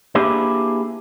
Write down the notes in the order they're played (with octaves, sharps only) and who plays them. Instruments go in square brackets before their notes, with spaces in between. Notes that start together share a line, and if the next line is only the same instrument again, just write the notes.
[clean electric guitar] A#3 D4 E4 G4 G#4 B4